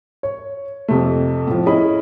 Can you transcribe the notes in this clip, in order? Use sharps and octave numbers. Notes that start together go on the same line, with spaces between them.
C#5
F2 C3 A3
A2 F3
C#4 E4 G#4 D#5 B5